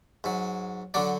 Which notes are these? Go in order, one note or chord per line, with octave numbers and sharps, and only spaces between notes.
G#2 F#3
D3 F#3 D4 D5